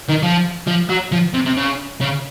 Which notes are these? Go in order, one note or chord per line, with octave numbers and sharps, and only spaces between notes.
D#3
F3
F3
F#3
F3
C3
C3
C#3
C#3